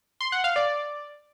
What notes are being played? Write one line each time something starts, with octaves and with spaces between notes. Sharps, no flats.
C6
F#5
F5
D5